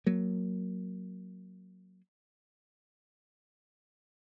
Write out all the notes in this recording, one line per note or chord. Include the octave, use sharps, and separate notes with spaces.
F#3 A#3